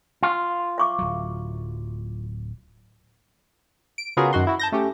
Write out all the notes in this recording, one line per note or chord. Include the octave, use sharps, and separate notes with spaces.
F4
E5 C#6 D6
D1 F#3
D7
C#3 B3 F4 F#4 G#4 A#4
F#2 D#3 F#4 C6
E4 F#4
A5 G6 A#6
A3 C#4 G4